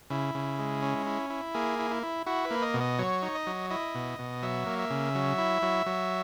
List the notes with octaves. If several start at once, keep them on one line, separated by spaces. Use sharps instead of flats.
C#3 E4
C#3
G#3
C#4
E4
E4
A#3 G#4
E4
E4
E4
E4 F#4
B4
A#3
D#5
B2
D#5
F#3 C#5
D#4
D#5
F#3
E4 D#5
B2
B2
F#3 E5
A#3
E5
C#3
F#3
E4
F#3
F#3